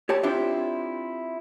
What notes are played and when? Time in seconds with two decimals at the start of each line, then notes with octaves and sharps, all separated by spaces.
0.09 G4 C#5 A5
0.23 C4 D4 E4 F4 G4 E5